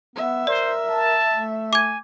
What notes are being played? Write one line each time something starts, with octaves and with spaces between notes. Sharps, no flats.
B3 E5
A#4 C5 D5
A5
A3
G#5 D6 G#6